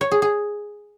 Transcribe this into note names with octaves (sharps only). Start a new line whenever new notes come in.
C#5
G#4
G#4